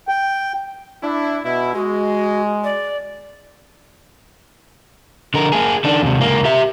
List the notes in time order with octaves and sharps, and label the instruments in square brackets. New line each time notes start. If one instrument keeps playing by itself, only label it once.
[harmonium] G5
[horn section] D4 E4
B2 E4
[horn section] G#3 [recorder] F#4
[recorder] D5
[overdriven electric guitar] D3 A#4
A#3 G#4
D#3 D4
D#2 C3
C#2 A#3
G4 E5